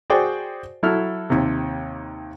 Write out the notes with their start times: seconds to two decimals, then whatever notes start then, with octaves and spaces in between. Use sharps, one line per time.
0.10 F#4 G#4 C5 D5 G5
0.83 F#3 E4 A4 F6
1.30 D#2 C3